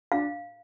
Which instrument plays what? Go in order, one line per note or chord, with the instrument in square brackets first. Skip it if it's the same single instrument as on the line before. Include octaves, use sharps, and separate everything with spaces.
[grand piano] D4 [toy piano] F5